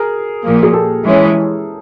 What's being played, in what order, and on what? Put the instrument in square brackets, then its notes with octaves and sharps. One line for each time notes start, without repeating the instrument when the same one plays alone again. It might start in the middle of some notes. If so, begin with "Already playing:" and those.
Already playing: [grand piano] G#4 A#4
[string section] A#2 F3 A#3
[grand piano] G#4
G4 A4
[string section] E3 G#3 C#4